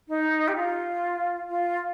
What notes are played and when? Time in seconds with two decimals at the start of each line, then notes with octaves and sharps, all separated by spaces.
0.08 D#4
0.48 G4
0.55 F4
1.49 F4